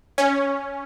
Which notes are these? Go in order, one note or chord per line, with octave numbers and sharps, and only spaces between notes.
C#4